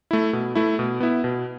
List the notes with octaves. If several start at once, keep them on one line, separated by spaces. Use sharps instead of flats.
A3 E4
B2
A3 E4
B2
B3 E4
B2